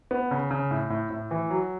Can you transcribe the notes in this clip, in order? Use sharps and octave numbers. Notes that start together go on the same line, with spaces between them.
B3
C#3
C#3
A2
A2
A2
E3
F#3